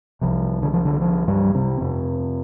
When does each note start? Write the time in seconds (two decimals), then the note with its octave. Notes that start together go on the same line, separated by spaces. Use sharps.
0.21 C2 C3 F3
0.62 D3
0.74 F3
0.85 D3
1.02 F3
1.28 G2 G3
1.55 C3 C4
1.81 F2 C3